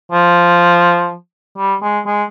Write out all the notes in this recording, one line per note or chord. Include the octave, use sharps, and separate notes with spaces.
F3
G3
G#3
G#3